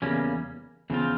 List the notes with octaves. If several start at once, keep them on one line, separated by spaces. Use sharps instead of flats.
E2 C#3 G3 A#3 C#4
E2 C#3 F3 C4 F4